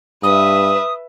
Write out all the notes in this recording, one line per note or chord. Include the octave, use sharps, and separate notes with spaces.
G2 B4 E5 D#6